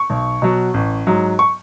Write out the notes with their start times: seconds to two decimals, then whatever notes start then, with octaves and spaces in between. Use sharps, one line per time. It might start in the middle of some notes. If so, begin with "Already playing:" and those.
Already playing: C#6
0.10 B1
0.42 B2 F#3
0.74 A1
1.07 G#2 F#3
1.39 C#6